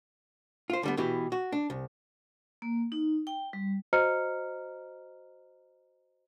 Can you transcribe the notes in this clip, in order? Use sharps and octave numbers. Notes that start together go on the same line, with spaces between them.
F4 C5
D3 G3 B3
B2 E3 G4
F#4
D4
C2
A#3
D#4
G5
G3
F#4 C5 D#5 A#5 F6 C#7